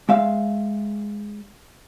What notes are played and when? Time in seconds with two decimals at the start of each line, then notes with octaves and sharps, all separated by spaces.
0.09 G#3 E5 F5